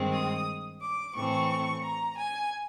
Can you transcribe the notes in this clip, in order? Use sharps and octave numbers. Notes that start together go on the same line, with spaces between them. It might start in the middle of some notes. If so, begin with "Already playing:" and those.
Already playing: G2 D#3 G#3 C4
D#6
D6
A2 E3 A3 C4 C#6
A#5
G#5